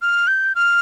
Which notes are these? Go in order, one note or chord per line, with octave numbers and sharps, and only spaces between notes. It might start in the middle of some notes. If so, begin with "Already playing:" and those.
F6
G6
F6